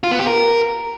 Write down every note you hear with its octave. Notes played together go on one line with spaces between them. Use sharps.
F4
B3
G4
A#4